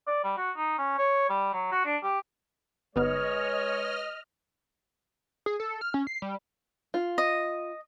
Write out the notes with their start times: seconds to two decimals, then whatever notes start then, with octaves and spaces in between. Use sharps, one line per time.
0.07 D5
0.24 G3
0.38 F#4
0.56 D#4
0.78 C#4
0.98 C#5
1.30 G3
1.53 F#3
1.72 F#4
1.86 D4
2.04 G4
2.96 G1 G#3 B3 D#4 B4 C#5 D#5 F6
5.46 G#4
5.60 A4
5.81 F6
5.94 C#4
6.07 C7
6.22 G3
6.94 F4
7.18 D#5